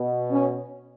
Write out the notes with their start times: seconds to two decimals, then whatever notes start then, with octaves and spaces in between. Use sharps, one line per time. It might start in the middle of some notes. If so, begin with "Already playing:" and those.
Already playing: B2
0.31 C#4